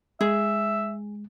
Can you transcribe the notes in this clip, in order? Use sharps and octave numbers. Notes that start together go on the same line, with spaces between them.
G#3 G#4 E5